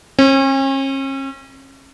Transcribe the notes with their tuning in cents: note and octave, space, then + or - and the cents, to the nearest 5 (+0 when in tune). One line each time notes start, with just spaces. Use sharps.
C#4 -40